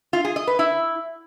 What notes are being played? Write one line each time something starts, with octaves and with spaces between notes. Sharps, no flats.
F4
G#4
D#5
B4
E4